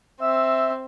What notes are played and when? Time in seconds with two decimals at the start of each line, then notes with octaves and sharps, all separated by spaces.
0.21 C4 E5 E6